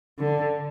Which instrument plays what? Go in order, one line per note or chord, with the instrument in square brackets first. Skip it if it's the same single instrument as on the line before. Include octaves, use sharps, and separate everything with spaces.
[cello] D3